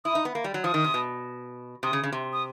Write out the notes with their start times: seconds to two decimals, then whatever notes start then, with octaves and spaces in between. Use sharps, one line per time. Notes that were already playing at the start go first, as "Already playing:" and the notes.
0.05 E4 D#6
0.15 D#4
0.25 B3
0.35 A#3
0.44 G3
0.54 F#3
0.64 F3 D#6
0.74 D#3
0.84 C3
0.94 B2
1.83 C3 D#6
1.93 C#3
2.04 C#3
2.13 C3
2.33 D#6